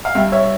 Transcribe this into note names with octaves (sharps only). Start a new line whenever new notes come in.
F5
G2 E5 G5
C#5 E5